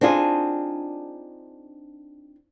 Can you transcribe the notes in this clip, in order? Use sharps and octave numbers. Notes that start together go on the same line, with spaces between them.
C4 D4 D#4 F4 G#4